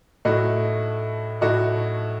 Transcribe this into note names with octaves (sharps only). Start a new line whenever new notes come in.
A2 A3 D#4 F#4
A2 A3 D#4 F#4